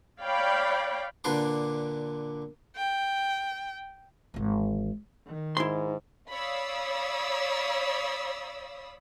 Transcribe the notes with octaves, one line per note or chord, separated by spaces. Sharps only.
C#5 D5 F5 G5 B5
A#2 D3 D4 B4 C6 D6
G5
G#1 E3
D#3
G#2 E4 C6
C#5 D5 F5 B5 D#6 E6